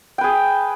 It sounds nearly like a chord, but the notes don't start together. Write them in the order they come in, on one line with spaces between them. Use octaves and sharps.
G5 B4 G#4